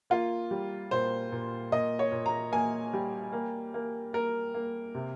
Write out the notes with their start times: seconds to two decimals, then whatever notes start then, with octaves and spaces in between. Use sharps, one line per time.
0.10 A#3 F4
0.51 G3
0.91 A#2 C5
1.32 A#2
1.72 A#2 D#5
1.99 C#5
2.12 A#2
2.26 A#5
2.52 A#3 G#5
2.93 G3
3.33 A#3
3.74 A#3
4.13 A#3 A#4
4.54 A#3
4.95 C3